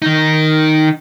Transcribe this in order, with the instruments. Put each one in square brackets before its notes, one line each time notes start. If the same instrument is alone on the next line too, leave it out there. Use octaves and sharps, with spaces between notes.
[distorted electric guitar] D#3 D#4